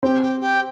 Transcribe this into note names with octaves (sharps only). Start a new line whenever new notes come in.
C4 G4
G4
G4